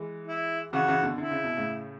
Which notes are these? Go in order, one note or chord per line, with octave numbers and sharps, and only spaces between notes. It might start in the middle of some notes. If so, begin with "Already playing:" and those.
Already playing: E3 G#3
E4
C#3 E3 F#4
C#3 E3
B2 D3
D3 E4
C#3
B2
A2 C#3